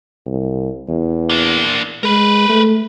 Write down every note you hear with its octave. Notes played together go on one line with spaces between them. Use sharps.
C2
E2
A#3 D4
G#3 A#4 B4
A3